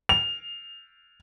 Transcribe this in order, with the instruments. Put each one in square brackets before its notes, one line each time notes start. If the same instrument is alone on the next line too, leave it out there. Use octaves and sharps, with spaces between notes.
[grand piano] F7